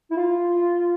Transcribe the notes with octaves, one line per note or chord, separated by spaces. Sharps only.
E4
F4